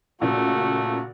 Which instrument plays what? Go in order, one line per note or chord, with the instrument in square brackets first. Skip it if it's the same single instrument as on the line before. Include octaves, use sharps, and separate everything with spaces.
[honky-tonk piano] A#2 C#3 [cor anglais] A3 [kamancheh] F#4